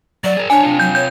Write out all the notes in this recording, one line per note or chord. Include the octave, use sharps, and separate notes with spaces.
F#3 D5
G#4 A#4
D4 C#5 D5 G#5
C3 F4
F#3 G6
C#5 G6